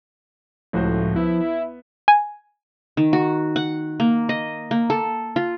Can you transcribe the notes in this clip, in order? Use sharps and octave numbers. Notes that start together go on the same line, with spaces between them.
C#2 A2 F3 F#4 C5
B3 E4 E5
G#5
D#3
F#4
F#5
A#3
D#5
A#3
A4
F4